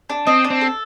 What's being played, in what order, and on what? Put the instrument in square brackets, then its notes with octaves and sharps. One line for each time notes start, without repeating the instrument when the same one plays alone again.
[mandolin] D4
[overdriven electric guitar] C4 [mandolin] D#5
[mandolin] D4
[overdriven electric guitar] C4
[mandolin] A4